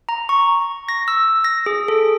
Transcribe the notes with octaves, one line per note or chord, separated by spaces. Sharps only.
A#5
C#6
A#6
E6
A#6
G#4
A4